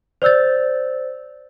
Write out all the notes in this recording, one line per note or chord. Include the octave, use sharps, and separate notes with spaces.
C5 D5 E6 G6 A6